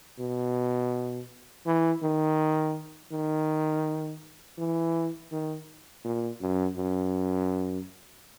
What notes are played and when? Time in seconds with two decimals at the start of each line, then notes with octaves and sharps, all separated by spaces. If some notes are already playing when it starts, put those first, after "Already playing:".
0.20 B2
1.67 E3
2.03 D#3
3.12 D#3
4.58 E3
5.31 D#3
6.04 A#2
6.41 F#2
6.77 F#2